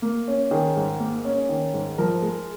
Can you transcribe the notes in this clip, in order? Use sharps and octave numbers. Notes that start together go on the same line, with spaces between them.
A#3
C#4
D#3 G#4
G#2
A#3
C#4
D#3
G#2
F3 A#4
G#3